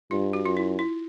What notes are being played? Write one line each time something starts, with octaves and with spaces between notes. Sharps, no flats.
G2 F4
F#4
F#2 F4
E4
E4